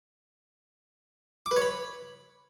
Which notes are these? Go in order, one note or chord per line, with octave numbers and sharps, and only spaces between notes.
D6
B4
C#5
B5